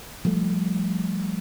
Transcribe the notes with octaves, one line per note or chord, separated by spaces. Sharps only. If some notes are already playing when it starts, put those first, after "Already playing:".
F3 G3 A3